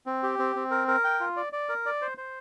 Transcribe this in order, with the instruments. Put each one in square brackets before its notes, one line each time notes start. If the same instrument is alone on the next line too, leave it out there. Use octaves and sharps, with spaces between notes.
[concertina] C4
G4
C4
C4
A#4
A#4
G5
F4
D5
D5
A#4
D5
C5
C5